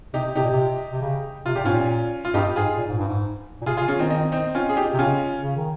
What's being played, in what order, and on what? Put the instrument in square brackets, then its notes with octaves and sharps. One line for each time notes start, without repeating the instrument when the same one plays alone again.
[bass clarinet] C3 [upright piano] D#4 G4
[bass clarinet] C3 [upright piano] D#4 G4
[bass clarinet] A#2
C3
C3
C#3
[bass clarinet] C3 [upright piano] F4
[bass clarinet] A#2 [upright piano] G4
[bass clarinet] G#2 [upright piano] C#4 F4
[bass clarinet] A#2
[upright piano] F4
[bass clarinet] G2 [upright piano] D#4 G4
[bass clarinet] G#2 [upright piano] F4 G#4
[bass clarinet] A#2
G#2
G2
G#2
A#2
[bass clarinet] C3 [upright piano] F4 G#4
[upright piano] F4 G#4
[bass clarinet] C#3
[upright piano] C#4 F4
[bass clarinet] D#3 [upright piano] C4 D#4
[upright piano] C4 D#4
C4 D#4
C#4 F4
G#4
D#4 G4
[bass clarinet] C3
[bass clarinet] C#3 [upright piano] C#4 F4
[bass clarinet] C#3
D#3